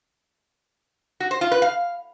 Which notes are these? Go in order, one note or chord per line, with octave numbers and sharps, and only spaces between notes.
F#4
C5
F4
B4
F5